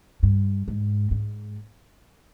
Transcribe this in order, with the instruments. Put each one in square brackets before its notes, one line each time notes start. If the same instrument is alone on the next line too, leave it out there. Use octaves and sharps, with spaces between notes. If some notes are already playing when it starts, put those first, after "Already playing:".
[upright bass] G2
G#2
G#2